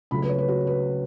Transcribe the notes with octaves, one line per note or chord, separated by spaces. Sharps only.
C#2 C#3 F#3 A3 B5
B4
C#5
B4
F#4
B4